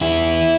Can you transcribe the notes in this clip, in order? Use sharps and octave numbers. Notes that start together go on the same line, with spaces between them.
E2 E4